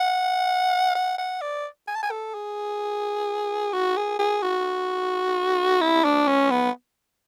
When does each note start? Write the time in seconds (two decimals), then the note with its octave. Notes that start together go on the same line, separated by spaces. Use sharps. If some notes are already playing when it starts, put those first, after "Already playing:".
Already playing: F#5
0.95 F#5
1.18 F#5
1.41 D5
1.87 G#5
1.95 A5
2.03 G#5
2.11 A4
2.34 G#4
3.73 F#4
3.97 G#4
4.19 G#4
4.42 F#4
5.81 E4
6.05 D4
6.27 C#4
6.51 B3